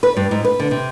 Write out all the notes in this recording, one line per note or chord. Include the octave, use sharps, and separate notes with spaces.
B4
G2
G#2
B4
D3
C3